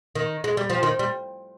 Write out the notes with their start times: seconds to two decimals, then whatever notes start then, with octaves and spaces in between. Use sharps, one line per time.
0.15 D#3
0.44 G#3
0.57 G3
0.70 F3
0.83 D#3
0.99 G3